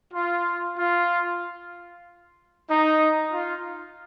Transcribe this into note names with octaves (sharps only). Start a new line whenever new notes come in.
F4
F4
D#4
F4